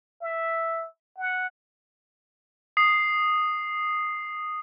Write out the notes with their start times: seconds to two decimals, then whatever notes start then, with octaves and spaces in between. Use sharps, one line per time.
0.21 E5
1.18 F#5
2.77 D#6 C7